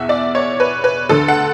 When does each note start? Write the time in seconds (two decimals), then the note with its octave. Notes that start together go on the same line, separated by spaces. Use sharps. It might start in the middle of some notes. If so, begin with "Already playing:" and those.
Already playing: E2 B2 E5 F#5
0.09 D5
0.35 C#5
0.60 B4
0.84 B4
1.09 D2 D3 A4
1.28 F#5